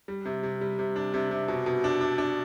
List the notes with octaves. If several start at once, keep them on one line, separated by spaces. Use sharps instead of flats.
G3
C3
C3
G3
C3
D4
C3
C3
B2
B2
D4
D4
D4